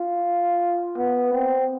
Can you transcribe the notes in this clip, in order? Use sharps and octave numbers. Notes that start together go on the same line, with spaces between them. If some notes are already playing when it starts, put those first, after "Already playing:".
Already playing: F4
B3
C4